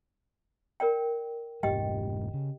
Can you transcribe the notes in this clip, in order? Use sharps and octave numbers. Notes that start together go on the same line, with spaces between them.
A#4 D5 G5
F1 G#2 G#3 G4 D#5 G5
C#3